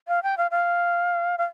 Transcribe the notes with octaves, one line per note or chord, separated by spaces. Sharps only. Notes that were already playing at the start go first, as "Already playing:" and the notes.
F5
G5
F5
F5
F5